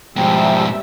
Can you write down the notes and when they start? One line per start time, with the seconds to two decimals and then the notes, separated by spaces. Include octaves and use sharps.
0.16 G#2 B2 F3 G3 E5 G5